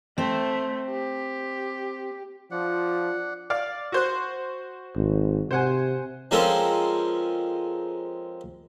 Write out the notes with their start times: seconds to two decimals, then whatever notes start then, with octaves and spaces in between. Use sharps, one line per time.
0.18 A3 C4 C5
0.91 G4
2.51 F3 D4 F4 F#5
3.50 D5 F5
3.92 F#4 C5 F#6
4.95 G#1
5.51 C3 C5 F#5 G#5
6.31 F3 G#3 C4 C#4 A4 A#4